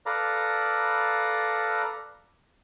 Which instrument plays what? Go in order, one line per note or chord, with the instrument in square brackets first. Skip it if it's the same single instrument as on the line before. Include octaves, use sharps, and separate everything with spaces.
[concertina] A4 B4 D5 F5 A#5